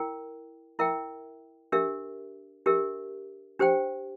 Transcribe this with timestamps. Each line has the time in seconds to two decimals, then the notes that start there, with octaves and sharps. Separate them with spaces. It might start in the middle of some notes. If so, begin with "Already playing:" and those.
Already playing: E4 A#4 G5
0.79 E4 A#4 E5 G5
1.72 D4 G4 A#4 E5
2.66 D4 G4 A#4 E5
3.59 D4 G4 C5 G5